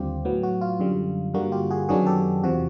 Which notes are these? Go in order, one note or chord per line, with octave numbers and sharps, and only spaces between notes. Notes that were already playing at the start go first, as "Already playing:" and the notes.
Already playing: D#2 D3 G3 C4 F4 G4
A2 F#3 B3
F#4
F4
F#2 D3 G3
G2 D3 G3 A#3 F#4
F4 G4
F#4 G#4
F#2 D#3 F#3 B3 D4 F#4 G#4
G4 A4
E2 C3 F3 F#4